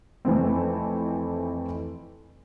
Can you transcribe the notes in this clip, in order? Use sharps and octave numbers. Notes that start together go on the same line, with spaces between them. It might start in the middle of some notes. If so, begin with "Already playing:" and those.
F2 E3 A3 C4